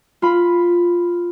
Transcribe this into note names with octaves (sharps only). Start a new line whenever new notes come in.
F4 B5